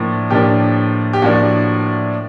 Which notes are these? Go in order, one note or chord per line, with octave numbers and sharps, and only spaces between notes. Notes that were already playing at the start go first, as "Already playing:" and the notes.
Already playing: A2 F3 A#3 D4
A2 F3 A#3 D4 G4
G4
A2 F3 A#3 D4 F#4